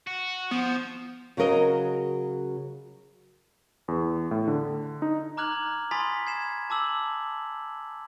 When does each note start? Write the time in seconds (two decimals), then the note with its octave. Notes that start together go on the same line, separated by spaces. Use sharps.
0.07 F#4
0.51 F3 B3
1.37 C#3 F#3 A#4 D#5
3.88 E2
4.31 A2
4.48 D3
5.02 D#4
5.37 A#5 D6 F6 F#6 G#6 F#7
5.91 G#5 B5 C6 D#6 A6 B6
6.27 G#6 C7 E7
6.70 A5 D6 E6 F#7